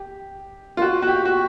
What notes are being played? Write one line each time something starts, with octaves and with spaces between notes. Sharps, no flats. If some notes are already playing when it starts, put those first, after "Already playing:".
Already playing: G4
F4
F#4
F#4
G4
F#4